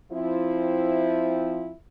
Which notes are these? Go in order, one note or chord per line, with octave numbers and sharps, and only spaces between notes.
F3 C4 E4